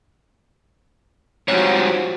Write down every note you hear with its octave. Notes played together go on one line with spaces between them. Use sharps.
G#2 F3 G3 C4 F#4 C#5